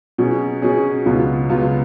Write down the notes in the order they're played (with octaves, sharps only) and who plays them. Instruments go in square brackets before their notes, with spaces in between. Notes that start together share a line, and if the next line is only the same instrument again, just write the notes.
[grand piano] B2 F#3 C#4 G#4
B2 F#3 C#4 G#4
C#2 B2 F#3 B3 F4
C#2 B2 F#3 B3 F4